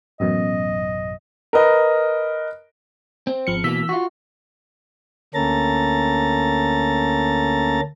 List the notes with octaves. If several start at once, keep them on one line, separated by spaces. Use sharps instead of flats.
A1 F#2 B2 D#5
A#4 B4 D#5
C4
G#1 F3 C#7
B2 E3 A#3 E6 B6
F4 F#4
D2 A#3 C#4 A4 A#5 A6